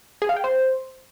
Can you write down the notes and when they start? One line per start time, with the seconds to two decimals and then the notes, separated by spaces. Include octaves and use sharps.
0.22 G#4
0.29 F5
0.36 G5
0.44 C5